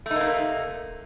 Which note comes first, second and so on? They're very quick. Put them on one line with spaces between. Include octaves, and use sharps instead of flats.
A3 D#4 A#3 C3